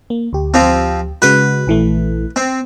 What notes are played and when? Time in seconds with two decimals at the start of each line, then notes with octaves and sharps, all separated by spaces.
0.10 A#3
0.33 D2 G4
0.54 F3 C4
1.22 C#3 G#3 F#4 B4
1.67 A#1 E3 A3
2.36 C4